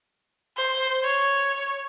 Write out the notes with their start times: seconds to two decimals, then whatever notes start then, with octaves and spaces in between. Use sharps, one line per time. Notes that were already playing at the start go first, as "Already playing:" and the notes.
0.57 C5
1.04 C#5